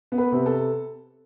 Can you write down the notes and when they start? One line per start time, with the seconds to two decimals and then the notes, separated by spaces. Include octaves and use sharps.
0.12 B3
0.18 B4
0.32 C3
0.46 A4